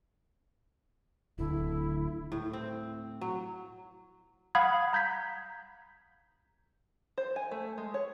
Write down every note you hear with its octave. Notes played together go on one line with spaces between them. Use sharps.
D1 D3 E4
A2
C4
F#3
F5 F#5 B5 D#6 G#6
A#5 G6 G#6 B6
C5
G#5
A3
G#3
C#5